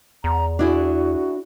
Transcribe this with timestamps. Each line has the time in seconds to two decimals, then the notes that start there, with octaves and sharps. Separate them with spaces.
0.24 E2 A#5
0.59 D4 E4 F#4 G#4